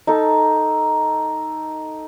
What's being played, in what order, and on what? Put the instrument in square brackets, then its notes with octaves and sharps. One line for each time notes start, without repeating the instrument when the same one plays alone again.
[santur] D#4 A4